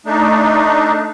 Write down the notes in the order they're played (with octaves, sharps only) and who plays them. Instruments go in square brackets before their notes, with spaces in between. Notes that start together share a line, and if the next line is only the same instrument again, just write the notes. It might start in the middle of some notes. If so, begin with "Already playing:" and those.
[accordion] A3 D4 D#4